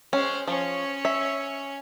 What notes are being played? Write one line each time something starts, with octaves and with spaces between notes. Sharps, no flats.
G#3 C#4 C5
F3 C#4 C#5
E5